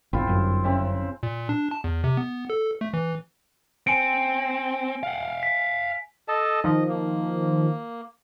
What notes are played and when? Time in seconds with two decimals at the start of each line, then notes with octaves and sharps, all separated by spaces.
0.13 G1 C4 E4 F4
0.27 G1 F#2
0.64 C#3 C4 E5
1.23 A#2
1.49 D4
1.71 A5
1.84 E2
2.04 C3
2.17 B3
2.50 A4
2.81 A3
2.94 E3
3.87 C4 G#5 C#7 D7
5.03 F5 F#5
5.43 B6
6.28 A4 D#5 A5
6.64 D#3 F3 D#5
6.89 A#3